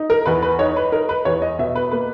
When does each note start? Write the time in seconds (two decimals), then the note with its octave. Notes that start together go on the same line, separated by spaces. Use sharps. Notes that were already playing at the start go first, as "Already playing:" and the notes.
Already playing: D#4
0.10 A#4
0.26 E2 B4
0.43 B4
0.59 D#4 C#5
0.76 B4
0.92 D#4 A#4
1.09 B4
1.25 E2 C#5
1.42 D#5
1.59 B2 E5
1.75 B4
1.91 A#3 B4